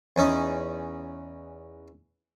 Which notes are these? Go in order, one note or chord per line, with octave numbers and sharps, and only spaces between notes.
E2 C#4 D#4